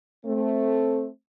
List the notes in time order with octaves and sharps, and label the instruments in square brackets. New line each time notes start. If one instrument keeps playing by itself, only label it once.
[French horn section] A3 C4